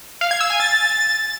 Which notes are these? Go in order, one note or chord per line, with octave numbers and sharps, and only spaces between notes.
F5
G#6
E6
G#5
A6